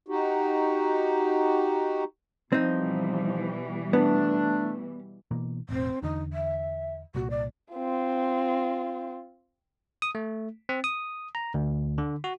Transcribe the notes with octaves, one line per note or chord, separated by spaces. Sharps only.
D#4 F#4 G4
B2 E3 F3 G3 C4 D#4
A3 B3 D4
B2 E3 A#3
E1 A1 C4
E2 D3 D#4
E5
C2 A#2 F#4
D5
C4 F4
D#6
A3
C4
D#6
A#5
D2
D3
F#4